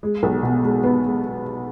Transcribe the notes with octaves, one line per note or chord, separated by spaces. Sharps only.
G#3
B1
B2
G#3
B3
G#3